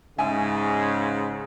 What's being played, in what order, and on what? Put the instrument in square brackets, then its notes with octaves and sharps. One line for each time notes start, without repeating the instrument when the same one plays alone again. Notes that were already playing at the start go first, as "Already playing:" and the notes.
[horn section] G#2 C#3 [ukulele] E5 G#5